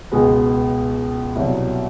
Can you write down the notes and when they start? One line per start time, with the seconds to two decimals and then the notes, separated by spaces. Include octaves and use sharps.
0.12 C#2 B2 G#3 B3
1.36 C2 B2 F#3